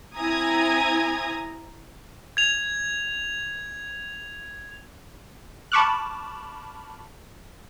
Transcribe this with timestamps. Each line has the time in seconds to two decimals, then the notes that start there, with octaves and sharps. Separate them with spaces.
0.17 C4 E4 G#5 A#5 D#6 G#6
2.37 G#6 F7
5.72 A5 B5 C#6 D6 F6 F#6